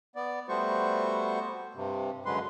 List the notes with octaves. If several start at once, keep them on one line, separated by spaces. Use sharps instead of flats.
B3 D5
G3 A3 B3 F#4 C5 C#6
G2 C3
F#2 D3 F#3 G#3 B4 C6